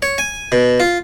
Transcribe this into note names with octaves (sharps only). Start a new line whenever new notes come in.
C#5
G#5
B2
F4